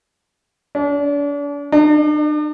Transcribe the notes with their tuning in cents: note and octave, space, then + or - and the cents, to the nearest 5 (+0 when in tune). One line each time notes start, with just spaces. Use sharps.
D4 -40
D4 +40